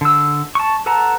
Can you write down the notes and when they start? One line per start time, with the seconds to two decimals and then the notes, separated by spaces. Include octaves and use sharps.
0.01 D3 E6
0.55 A5 C#6
0.86 A4 B4 F#5 A5 A#5